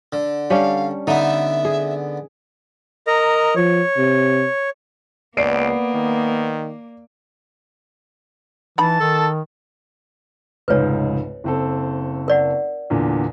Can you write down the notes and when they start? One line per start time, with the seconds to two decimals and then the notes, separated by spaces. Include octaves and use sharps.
0.13 D3
0.50 G3 C#4 D4 F5
1.07 D3 B3 D#4 E5
1.65 G#4
3.07 A#4 D#5 A#5
3.56 F3 C#5
3.97 C3
5.37 C#2 A#3 B3 D5 C7 D7
5.95 D#3
8.78 E3 D#4 B4 A5 B5
9.00 D#3 A4
10.68 F1 C#2 G#2 B4 C#5
11.44 F#1 C4 A4
12.28 A#4 D5 F#5
12.90 E2 A#2 D3